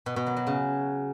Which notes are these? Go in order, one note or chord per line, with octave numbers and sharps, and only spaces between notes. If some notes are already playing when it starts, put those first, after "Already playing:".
B2
B2
F#3
F#3
C#3